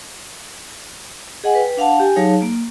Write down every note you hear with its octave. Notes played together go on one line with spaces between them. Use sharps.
G#4 D#5 F#5 G#5
B4 G5
D4 F5 F#5 A5
G4 G5 G#5
F#3 D#4 G#4 C#5 F5 A5
A#3